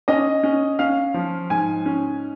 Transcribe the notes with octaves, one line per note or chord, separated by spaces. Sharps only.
C#4 D#5
C#4
C#4 F5
F3
G#2 G#5
C#4